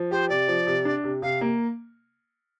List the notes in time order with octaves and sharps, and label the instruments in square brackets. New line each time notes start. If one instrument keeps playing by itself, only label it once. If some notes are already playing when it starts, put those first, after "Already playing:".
Already playing: [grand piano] F3
[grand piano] G4 [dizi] C5
[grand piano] C3 [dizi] D5
[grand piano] F3
C3
D4
C3
[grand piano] C3 [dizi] F5
[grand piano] A#3